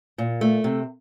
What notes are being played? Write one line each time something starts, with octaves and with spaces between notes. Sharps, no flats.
A#2
A3
C3